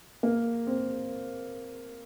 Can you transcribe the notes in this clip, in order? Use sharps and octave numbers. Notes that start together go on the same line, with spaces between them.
A#3
C4